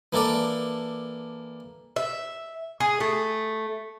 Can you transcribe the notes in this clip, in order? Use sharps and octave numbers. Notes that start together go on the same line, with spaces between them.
E3 A#3 D4 A4 D5
E5
G#4
A3